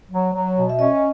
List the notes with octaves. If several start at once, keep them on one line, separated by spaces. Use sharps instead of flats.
F#3
F#3
B2
E5
C#4 D#5